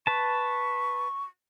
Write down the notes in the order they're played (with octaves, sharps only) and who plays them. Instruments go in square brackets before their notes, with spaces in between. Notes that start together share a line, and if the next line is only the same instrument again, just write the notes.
[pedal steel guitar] B4 A5 [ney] C#6